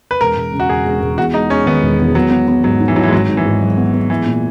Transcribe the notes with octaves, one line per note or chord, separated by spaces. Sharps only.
B4
E1 A#4
E1
C#3
F#4
E1 G#4
E1
E1
E2 F#4
G#3 D#4
G#3 C#4
D#3 B3
E1
E2
F#3 B3
B3
B3
G#2 F#3
D#4
E3
F#3 D#4
E3
G#3
G#1 F#3
G#1
E3
G#2
F#3
B3
B3
E3 G#3
A#2